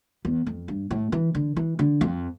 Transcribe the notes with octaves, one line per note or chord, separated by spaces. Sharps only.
E2
F2
G2
A2
E3
D3
E3
D3
F2